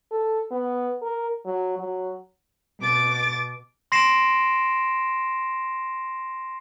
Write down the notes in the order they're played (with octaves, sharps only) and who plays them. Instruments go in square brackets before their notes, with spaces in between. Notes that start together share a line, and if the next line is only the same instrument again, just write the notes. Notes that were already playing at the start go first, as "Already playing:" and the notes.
[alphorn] A4
B3
A#4
F#3
F#3
[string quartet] B2 D6 A6
[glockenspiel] C6 A#6 C7 D7 E7